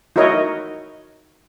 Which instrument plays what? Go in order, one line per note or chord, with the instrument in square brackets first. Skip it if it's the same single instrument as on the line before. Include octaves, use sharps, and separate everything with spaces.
[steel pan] D#4 E4 F#4 A#4 C#5 D#5